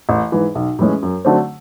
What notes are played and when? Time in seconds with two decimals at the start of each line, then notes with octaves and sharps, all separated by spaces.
0.09 A1
0.32 G#2 E3
0.55 B1
0.79 A2 E3 G#3 C#4
1.02 F#2
1.25 D3 F#3 A3 C4